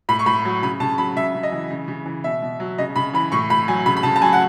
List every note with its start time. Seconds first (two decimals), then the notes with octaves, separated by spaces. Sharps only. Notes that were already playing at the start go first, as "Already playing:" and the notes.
0.09 A2 B5
0.19 C#6
0.26 A2 B5
0.45 F#3
0.62 C#3 B5
0.80 C#3 A5
0.98 F#3 B5
1.17 C#3 E5
1.35 C#3
1.43 D#5
1.52 E3
1.70 C#3
1.88 C#3
2.06 E3
2.24 B2 E5
2.42 B2
2.60 F#3
2.78 C#3 D#5
2.96 C#3 B5
3.14 E3 B5
3.32 A2 C#6
3.50 A2 B5
3.68 F#3 G#5
3.86 C#3 B5
3.97 B5
4.03 C#3 A5
4.16 A5
4.22 F#3 G#5
4.33 F#5